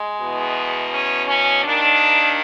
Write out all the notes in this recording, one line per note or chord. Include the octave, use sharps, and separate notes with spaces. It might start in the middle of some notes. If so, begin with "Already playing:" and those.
Already playing: G#3
E2 B2
C#4
C#4
D#2 D#3 D4